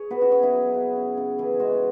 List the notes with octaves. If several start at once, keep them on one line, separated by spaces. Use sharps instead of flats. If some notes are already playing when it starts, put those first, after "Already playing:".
Already playing: G#4 C#5
B3 F#4 B4
C#4 F#4
B3 C#4
E4 G#4
F#3
C#3
C#3
C#3
E3 E4 G#4
G#3 C#4 F#4